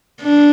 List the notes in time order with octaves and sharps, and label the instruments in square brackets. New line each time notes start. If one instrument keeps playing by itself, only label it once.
[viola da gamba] D4